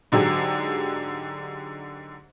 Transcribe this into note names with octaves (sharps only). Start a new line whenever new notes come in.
G#2 D3 F#3 G4 G#4